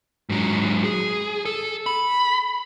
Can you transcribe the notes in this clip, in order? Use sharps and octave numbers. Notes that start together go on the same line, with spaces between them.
G#2 F#3
G#4
A4
B5